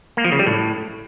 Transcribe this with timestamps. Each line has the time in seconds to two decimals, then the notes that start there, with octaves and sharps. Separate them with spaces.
0.17 A#3
0.24 F3
0.32 C#3
0.39 G3
0.47 A2